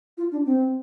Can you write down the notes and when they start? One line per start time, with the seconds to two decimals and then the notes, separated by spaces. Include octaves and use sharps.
0.18 F4
0.32 D4
0.46 C4